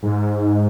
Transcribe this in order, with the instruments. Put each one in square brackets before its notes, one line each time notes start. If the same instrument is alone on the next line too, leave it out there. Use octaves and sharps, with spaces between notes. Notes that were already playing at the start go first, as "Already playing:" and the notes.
[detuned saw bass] G#2